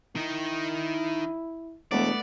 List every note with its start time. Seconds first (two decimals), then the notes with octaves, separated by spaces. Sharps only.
0.15 D#3 D#4 E4
1.91 E1 A3 B3 D5